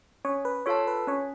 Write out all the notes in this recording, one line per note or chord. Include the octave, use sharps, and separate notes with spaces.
C#4 C#5
B4
F4 A4 C#5 F5 A5
B4
C#4 C#5